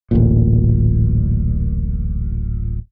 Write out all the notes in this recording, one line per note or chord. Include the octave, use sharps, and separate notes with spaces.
D1 A1 A#2